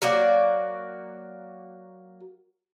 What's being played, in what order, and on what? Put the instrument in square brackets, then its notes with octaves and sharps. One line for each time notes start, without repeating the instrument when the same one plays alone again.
[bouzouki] F#3 A#3 F#4 D5